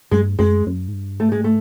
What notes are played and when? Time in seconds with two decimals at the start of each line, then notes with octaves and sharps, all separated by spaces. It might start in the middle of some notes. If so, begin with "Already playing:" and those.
0.11 G2 G#3
0.39 F#2 G#3
0.67 F#2
0.88 G#2
0.93 G2
1.20 G#2 A3
1.32 G#3
1.44 A3